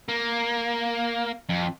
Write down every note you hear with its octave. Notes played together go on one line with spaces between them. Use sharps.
A#3
F2